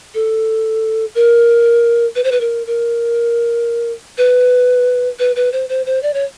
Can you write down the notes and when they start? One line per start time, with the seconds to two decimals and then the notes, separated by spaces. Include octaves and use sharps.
0.14 A4
1.15 A#4
2.16 B4
2.24 C5
2.32 B4
2.41 A#4
2.67 A#4
4.18 B4
5.19 B4
5.36 B4
5.53 C5
5.69 C5
5.86 C5
6.03 D5
6.14 C#5